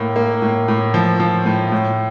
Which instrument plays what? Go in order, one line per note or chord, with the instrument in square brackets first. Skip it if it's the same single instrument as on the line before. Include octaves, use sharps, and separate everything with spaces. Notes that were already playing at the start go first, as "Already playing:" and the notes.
Already playing: [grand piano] A2 A#3
A#3
A2
A2
F3
F3
A2
A2